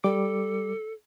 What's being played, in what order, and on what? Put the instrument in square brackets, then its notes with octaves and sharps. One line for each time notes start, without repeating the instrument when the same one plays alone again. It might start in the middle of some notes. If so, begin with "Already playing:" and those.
[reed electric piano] G3 D6 [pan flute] A4